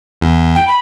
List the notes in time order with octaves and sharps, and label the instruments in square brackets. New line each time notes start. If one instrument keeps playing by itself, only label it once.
[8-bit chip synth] E2
[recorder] G5
B5